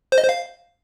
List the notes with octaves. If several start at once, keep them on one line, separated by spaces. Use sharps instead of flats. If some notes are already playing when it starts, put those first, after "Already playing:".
C5
D#5
C5
F5